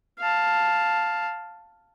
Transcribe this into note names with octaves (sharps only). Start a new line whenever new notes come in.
F5 A5